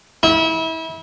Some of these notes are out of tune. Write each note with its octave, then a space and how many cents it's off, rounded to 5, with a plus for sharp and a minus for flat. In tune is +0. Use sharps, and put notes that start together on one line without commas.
E4 -30